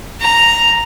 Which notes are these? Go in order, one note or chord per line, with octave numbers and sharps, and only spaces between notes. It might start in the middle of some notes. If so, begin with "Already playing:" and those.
A#5